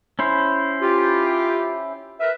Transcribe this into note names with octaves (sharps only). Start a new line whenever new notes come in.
C#4 E4 C5
F4 G4
A#4 B4 E5